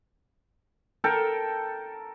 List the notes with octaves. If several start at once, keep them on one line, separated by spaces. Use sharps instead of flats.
A4 A#4 G5